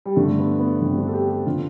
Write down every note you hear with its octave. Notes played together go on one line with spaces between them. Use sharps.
G3
G2 D3 A3
B3
B3
G2 D3 C4
D4
A4
G4
G4
D3 F4